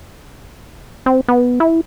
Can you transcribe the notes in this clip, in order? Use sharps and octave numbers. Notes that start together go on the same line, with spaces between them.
C4
B3
E4